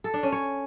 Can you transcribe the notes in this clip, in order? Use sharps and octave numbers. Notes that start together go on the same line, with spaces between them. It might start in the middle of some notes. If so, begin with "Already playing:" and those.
A4
D4
C#4
C#5